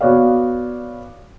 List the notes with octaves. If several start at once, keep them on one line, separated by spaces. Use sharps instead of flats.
B3 F#4 C#5 D5 F5